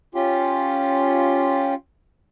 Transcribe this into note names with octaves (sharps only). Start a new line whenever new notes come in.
C#4 F4 G4